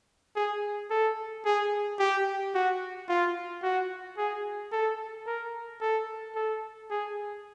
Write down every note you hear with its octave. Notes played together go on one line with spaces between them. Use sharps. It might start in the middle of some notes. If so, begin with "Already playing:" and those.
G#4
A4
G#4
G4
F#4
F4
F#4
G#4
A4
A#4
A4
A4
G#4